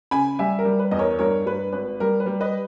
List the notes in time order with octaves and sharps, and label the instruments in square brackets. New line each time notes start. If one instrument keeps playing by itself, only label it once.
[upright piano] C#3 G#5 B5
G3 E5 G#5
A#4
G3
B4
E2 D#5
A#4 C#5
G2 A#4 C#5
G2 B4
G#1 B4
G3 A#4
B4
G3
B4 D#5